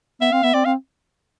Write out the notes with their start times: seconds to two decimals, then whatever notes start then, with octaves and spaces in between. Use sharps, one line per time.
0.21 B3 E5
0.32 C4 F5
0.43 B3 E5
0.54 C4 D5
0.65 C4 F5